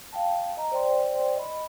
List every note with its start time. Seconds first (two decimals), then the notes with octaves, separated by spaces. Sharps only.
0.13 F5 G5 A5
0.57 D#5 A#5
0.72 C5 D5 G5 C6
1.36 D#5 B5